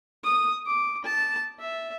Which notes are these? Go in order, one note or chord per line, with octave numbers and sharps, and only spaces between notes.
D#6
D6
A5
E5